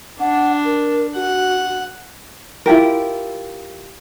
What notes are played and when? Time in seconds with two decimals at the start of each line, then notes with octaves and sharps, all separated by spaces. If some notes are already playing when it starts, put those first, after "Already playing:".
0.20 D4 F#5
0.65 A#4
1.15 F#4 F#5
2.66 E4 F4 G4 A#4